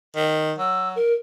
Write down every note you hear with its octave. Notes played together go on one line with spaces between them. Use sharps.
D#3
F#3 E6
A#4